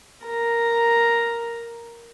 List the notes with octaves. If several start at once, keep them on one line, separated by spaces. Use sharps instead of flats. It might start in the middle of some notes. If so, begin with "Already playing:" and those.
A#4 A#5